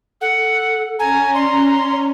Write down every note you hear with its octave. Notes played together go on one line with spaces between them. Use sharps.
A4 F#5
C#4 G#5 A#5
D5 C6